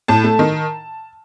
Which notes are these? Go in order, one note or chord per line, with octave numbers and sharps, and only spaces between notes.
A2 A5
A3
D#3